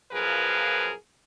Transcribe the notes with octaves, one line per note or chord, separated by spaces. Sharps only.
F#2 A#2 F3 G#4 A#4 B4